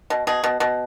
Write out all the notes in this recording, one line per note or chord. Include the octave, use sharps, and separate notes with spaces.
B2
B2 G#4
B2
B2